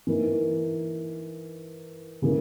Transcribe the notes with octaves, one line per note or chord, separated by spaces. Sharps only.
E3 A#3 D#4
C#3 E3 A#3